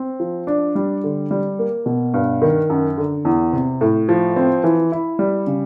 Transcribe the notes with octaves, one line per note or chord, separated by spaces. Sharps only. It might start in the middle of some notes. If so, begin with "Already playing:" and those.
Already playing: C4
F3
D4
G3
D3
G3
A#3
B2
G2
D#3
F#2
D3
E2
C3
A2
F3
C4
E3
E4
G3
C#3